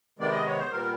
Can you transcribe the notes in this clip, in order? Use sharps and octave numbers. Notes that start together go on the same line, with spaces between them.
C3 D#3 G#3 B3 D5
D#5
C#5
C5
A#2 G3 B3 A#4